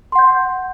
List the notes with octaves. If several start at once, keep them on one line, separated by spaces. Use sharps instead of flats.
F#5 C6 G6